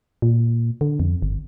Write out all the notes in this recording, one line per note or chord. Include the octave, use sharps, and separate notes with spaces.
A#2
D3
F2
G1